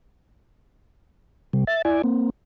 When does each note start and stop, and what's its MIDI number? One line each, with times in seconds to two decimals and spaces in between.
1.53 1.64 48
1.53 1.64 55
1.67 1.82 76
1.67 1.82 93
1.85 2.02 64
1.85 2.02 74
1.85 2.02 80
2.04 2.30 58
2.04 2.30 60